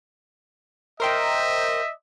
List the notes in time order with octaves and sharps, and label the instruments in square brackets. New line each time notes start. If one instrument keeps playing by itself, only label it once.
[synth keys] A#4 C5 G5 [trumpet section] D#5 E5